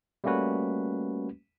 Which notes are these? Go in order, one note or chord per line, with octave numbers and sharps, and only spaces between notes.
G3 A3 A#3 C#4 F#4 B4